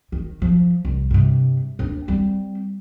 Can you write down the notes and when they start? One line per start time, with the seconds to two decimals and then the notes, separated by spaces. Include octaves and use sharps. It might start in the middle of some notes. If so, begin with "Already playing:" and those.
0.12 D#3
0.42 F3
0.85 C2
1.11 G2 C3
1.79 D#2 D4
2.08 G3 C4